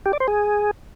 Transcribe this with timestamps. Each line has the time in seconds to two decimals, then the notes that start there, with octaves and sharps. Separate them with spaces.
0.06 G4
0.13 D5
0.20 C5
0.28 G#4